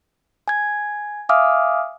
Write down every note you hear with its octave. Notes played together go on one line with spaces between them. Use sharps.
G#5 G#6
E5 F5 G#5 D6 D#6 F6